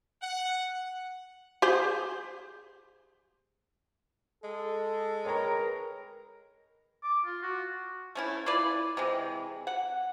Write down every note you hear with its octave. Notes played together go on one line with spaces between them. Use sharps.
F#5
G4 G#4 C5
G#3 A4
A#4 B4 C#5 G5 A#5
D6
F4
F#4
A3 C#4 E4
E4 F4 B4 D5
C3 E3 G#3
F#5